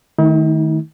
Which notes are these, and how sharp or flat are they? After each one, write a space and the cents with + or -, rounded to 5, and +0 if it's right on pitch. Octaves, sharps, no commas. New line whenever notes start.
D#3 +0 A3 +0 D#4 +45